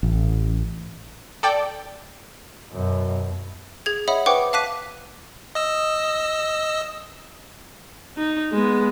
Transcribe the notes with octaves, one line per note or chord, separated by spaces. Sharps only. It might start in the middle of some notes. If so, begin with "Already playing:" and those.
A1
A4 D5 G5
F#2 B2
G#4 G#6
C#5 D#5 E5 F#5 B5 D#6
B4 C5 F#5 G5 C#6 D6
F5 A5 D6 F#6 B6 D#7
D#5 E6
D#4
G#3 B3